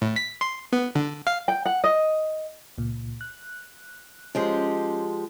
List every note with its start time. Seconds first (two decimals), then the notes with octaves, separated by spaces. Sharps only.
0.02 A2
0.16 B6
0.41 C6
0.73 B3
0.95 D3
1.27 F5
1.48 G5
1.66 F#5
1.84 D#5
2.78 C#2 A#2
3.21 F#6
4.35 F3 G#3 C#4 G4